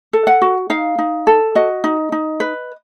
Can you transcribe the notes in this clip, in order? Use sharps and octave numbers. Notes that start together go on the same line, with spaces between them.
A4
F#5
F#4
D#4 F5
D#4
A4
F#4 D#5
D#4
D#4
B4